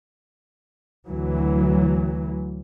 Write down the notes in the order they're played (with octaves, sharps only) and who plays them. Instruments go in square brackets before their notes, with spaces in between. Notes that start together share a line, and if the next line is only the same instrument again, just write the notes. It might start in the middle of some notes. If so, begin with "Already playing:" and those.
[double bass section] D2 E3 F#3